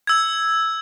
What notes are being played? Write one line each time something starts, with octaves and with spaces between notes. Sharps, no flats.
E6 G#6